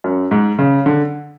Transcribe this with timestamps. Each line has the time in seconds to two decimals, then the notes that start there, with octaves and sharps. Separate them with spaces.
0.04 F#2
0.31 G#2
0.59 C#3
0.86 D3